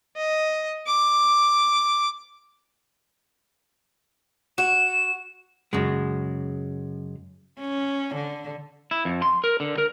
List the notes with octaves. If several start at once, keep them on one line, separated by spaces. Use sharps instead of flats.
D#5
D6
F#4 E7
F#2 C#3 G#3
C#4
D3
E4
F2
C6
A#4
D3
A#4